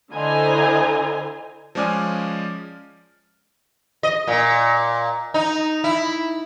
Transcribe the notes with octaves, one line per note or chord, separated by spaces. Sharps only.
D3 E4 C5 D#5 G#5 A#5
F3 G#3 C#4 D5 G#5 F6
D#5
A#2
D#4
E4